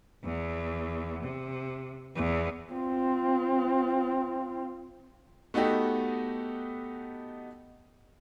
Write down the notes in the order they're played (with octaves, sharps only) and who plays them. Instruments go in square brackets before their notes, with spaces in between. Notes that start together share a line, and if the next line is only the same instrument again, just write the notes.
[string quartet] E2
C3
E2
[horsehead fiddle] C4 F4
[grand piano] A3 B3 D#4 F#4 G4 A4